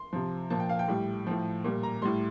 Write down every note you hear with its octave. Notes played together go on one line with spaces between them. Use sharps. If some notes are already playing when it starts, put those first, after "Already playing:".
Already playing: C6
C3 F3
A#2 F3 A5
G5
F5
G5
A2 G3
A2 F3
A#2 G3
A#5
A2 G3 C6